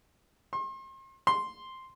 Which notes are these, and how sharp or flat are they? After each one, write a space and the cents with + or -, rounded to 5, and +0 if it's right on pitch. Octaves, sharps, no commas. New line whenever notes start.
C6 +40
C6 +0